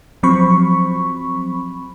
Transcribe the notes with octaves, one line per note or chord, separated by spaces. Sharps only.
F3 F#3 C4 B5 C#6